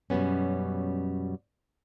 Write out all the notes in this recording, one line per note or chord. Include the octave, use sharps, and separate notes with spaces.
F#2 B2 G3 B3 C#4